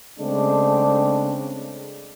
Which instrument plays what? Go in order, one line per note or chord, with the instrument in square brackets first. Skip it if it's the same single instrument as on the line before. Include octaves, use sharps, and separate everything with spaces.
[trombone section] C#3 G#3 A3 C4 D4